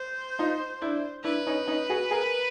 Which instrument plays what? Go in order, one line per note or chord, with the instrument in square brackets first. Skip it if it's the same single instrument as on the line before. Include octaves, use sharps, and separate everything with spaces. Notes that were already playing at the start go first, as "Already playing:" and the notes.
Already playing: [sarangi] C5
[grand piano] D#4 F4
D4 E4
[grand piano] D4 E4 [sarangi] B4
[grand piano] C#4 D#4
C#4 D#4
F#4 G#4
G#4 A#4